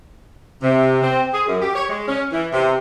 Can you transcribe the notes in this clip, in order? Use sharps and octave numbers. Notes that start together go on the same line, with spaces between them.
C3
C4
G#4
F#2
G4
C#5
G#3
C#4
E3
C3